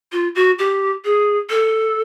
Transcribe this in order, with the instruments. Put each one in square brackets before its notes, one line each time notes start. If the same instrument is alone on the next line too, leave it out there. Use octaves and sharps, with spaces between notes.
[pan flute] F4
F#4
G4
G#4
A4